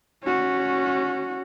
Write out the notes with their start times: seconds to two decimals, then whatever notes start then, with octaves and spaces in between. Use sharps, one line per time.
0.23 C#4 F#4